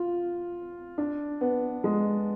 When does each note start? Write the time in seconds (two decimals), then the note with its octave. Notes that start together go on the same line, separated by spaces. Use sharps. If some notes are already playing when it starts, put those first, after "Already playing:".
Already playing: F4
0.98 D4
1.41 B3
1.84 G#3